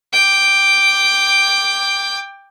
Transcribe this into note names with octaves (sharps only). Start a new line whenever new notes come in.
G5 D6